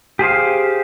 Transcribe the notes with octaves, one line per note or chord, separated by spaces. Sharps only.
G4 G#4 C5 F5